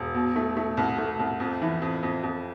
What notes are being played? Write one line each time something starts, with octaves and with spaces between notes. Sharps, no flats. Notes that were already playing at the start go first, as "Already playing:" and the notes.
Already playing: E1
B2
A3
A3
C2
A3
C2
F2
E3
F2
F2
F2